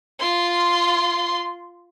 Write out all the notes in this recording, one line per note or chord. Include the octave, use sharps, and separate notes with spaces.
F4 C6